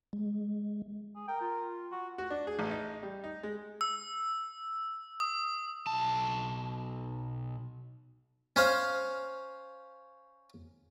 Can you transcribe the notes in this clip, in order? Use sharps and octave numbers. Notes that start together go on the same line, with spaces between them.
G#3
G#4
A#4 G5
F4
F#4
F#4
D4
G#4
A1
D#4
G3
D#4
G#3
E6
D#6
B1 A5
C#4 C5 F5